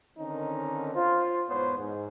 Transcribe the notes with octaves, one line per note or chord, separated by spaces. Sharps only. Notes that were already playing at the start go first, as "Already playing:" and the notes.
D3 D#3 C4 C#4 D#4 A#4
F4 C5
E2 G#2 B3 C5 C#5
G#2